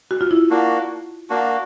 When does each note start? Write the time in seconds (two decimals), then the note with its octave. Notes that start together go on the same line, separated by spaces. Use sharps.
0.11 F#4
0.21 F4
0.31 E4
0.50 A#3 D4 F#4
1.30 A#3 D4 F#4